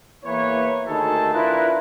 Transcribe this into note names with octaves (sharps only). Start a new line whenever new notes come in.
E2 E3 A#3 B4 C#5
D2 D#3 D#4 G#4 A4 A5
D4 E4 F4 A#4 B4